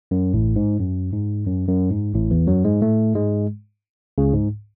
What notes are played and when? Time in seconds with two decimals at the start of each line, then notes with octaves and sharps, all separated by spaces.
0.11 F#2
0.34 A1 A2
0.56 G#2
0.79 F#2
1.13 G#2
1.46 F#2
1.69 F#2
1.91 G#2
2.14 A1 A2
2.31 E2 E3
2.47 F#2 F#3
2.64 G#2 G#3
2.82 A2 A3
3.15 G#2 G#3
4.18 C#2 C#3
4.34 G#2